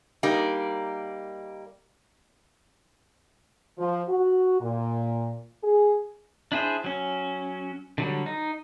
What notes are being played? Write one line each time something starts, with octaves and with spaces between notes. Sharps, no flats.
G3 A#3 D#4
F3
F#4
A#2
G#4
D4 E4 G#4 C5
F#3 C#4
D3 F#3 G3
D#4